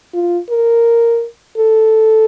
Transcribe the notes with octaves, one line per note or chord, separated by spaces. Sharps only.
F4
A#4
A4